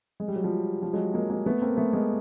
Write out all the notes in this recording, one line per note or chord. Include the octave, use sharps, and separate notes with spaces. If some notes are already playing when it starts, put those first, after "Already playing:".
G#3
G3
F#3
F3 G3
F3 G3
F#3 G#3
G#3 A#3
G#3 A#3
A3 B3
A#3 C4
A3 B3
G#3 A#3